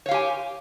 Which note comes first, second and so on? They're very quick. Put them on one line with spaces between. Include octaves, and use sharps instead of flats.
C#5 F5 G4 G#5